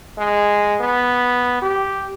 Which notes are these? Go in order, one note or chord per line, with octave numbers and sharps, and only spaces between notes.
G#3
B3
G4